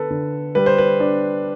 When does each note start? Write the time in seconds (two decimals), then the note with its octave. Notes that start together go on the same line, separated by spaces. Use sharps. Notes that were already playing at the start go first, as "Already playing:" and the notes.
Already playing: D3 B3 A4 B4
0.10 D3
0.55 G3 B4
0.66 C5
0.78 B4
1.00 D4